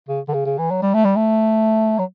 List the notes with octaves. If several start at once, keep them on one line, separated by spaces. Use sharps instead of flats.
C#3
D3
C#3
C#3
E3
F#3
G3
A3
G3
A3
F#3